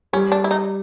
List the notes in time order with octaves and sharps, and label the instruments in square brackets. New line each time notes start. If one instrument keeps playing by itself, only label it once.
[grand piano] G3 [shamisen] C#4
[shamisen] D4
E4
D#4